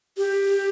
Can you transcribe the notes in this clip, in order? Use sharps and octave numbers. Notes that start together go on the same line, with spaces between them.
G4